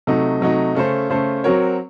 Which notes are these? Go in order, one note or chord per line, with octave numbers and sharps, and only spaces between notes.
C3 F#3 A3 D#4
C3 F#3 A3 D#4
C#3 A3 C#4 A4 C5
C#3 A3 C#4 A4 C5
F#3 C4 F#4 A#4 C#5